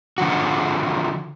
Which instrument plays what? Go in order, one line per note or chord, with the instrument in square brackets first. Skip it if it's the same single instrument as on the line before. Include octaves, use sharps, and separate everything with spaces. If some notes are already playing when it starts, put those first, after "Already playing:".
[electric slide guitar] D3 F3 F#4